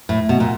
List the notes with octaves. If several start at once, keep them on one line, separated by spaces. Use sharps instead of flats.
A2
B2
A#2